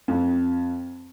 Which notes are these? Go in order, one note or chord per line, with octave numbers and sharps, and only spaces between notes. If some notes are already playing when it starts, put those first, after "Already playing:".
F2